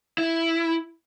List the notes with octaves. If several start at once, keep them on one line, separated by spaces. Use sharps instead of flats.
E4